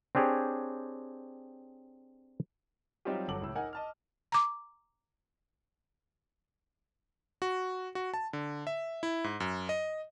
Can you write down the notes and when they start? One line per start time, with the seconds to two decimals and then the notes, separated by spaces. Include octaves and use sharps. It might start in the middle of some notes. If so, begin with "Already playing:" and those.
0.15 C4 D4 G4 G#4 C#5
3.05 F#3 G3 C4 D#4 F4 G4
3.28 G1 F#3 A4 D6 F#7
3.41 C#2 A2 E6
3.55 D#4 A#4 F#5 G#5
3.73 D#5 A5 F6
4.32 A#5 D6
7.42 F#4
7.95 F#4
8.14 A5
8.33 D3
8.67 E5
9.03 E4
9.24 G#2
9.40 F#2
9.69 D#5